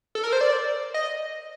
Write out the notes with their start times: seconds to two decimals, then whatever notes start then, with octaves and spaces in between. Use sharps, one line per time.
0.15 A4
0.24 A#4
0.33 C5
0.41 D5
0.94 D#5